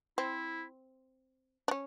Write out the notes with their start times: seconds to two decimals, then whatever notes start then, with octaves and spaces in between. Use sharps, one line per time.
0.18 C4 E4
1.68 D4
1.71 C#4